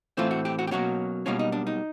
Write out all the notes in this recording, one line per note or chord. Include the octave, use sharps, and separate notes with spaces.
A2 E3 A3 C4 F4
F#4
G4
F#4
G4
B2 F#3 A#3 C#4 F#4
B1 B2 G3 A#3 C#4 F4
D#4
D4
D#4